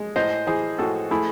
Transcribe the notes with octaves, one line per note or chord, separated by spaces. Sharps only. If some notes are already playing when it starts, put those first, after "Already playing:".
Already playing: G#3
A2 C5 D#5
E3 G#4 C5
A2 F#4 A4
A3 E4 G#4